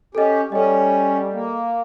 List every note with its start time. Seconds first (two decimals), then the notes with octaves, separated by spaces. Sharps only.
0.15 C#4 G4 A4 D#5
0.52 G3 C#4 A4 D#5
1.33 A#3